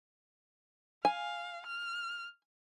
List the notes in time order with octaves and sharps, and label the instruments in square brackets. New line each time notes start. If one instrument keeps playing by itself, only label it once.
[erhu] F5 [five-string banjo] G#5
[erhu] F6